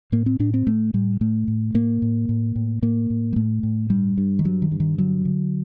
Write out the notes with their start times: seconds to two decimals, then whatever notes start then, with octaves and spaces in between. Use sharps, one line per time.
0.12 A2 A#3
0.26 C4
0.39 A2 D4
0.54 C4
0.67 A2 A3
0.94 A2 G3
1.21 A2 A3
1.48 A2
1.74 A2 A#3
2.02 A2
2.29 A2
2.56 A2
2.82 A2 A#3
3.10 A2
3.33 G3
3.36 A2 A3
3.63 A2
3.90 G2 G3
4.18 G2
4.39 D#3
4.45 G2 F#3
4.62 D#3
4.71 G2
4.80 D#3
4.98 D3 F#3
5.25 D3